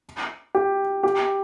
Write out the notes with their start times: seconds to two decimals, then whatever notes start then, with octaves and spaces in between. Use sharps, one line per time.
0.55 G4
1.03 G4